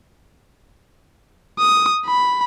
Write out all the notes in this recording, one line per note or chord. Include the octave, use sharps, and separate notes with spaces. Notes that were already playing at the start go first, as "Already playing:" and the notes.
D#6
B5